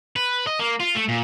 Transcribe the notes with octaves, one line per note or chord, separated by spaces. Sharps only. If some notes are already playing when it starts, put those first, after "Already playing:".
B4
D#5
A#3
F4
A3
A#2